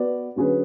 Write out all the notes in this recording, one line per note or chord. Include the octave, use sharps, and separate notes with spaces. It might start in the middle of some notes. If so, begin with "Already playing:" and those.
Already playing: B3 F#4 B4 D5
D3 F#3 C#4 G#4 B4